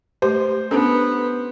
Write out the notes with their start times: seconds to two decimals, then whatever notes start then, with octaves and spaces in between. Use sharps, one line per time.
0.22 A3 G4 C5
0.71 B3 C#4 D4 A4